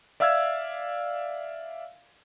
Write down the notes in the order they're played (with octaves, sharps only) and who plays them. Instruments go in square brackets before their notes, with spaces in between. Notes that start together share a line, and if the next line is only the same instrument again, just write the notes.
[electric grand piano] D5 E5 F5 E6 F6 G#6